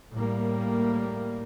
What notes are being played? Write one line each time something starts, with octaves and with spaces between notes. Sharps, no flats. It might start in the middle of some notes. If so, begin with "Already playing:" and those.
A2 G3 A#3